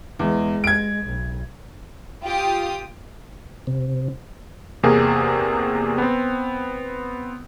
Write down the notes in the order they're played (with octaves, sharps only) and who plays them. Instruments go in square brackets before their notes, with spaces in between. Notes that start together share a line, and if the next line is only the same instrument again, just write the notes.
[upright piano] E2 [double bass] G#3
[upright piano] G#6 D7
[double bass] B1
[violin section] F4 G4 D#6 [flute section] G5
[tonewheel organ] C3
[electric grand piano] E2 C3 A#3 G#4
B3 C4